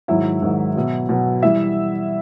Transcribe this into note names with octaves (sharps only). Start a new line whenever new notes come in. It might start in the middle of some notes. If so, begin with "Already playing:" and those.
G#2 D#3 F#3 E4 E5
G#2 D#3 F#3
B2 F#3
B2 F#3
E3 G3 E4 E5